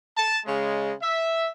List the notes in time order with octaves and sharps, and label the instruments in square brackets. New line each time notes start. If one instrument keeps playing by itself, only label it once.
[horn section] A5
C#3 G#3
E5